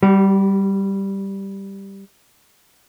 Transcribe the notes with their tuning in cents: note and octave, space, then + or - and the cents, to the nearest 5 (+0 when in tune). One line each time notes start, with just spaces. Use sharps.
G3 +0 G4 -40